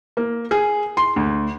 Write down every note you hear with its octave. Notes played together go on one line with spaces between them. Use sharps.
A#3
G#4
C6
D2